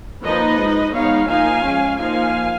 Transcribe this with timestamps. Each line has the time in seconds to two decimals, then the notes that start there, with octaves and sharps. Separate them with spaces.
0.24 F3 A#3 D#4 B4 D#5
0.59 G#3 D#4
0.94 G#3 B3 D#4 C#5 F5
1.29 F3 A#3 D#4 F5 G#5
1.64 G#3 C#4
1.99 F3 A#3 D#4 F5 G#5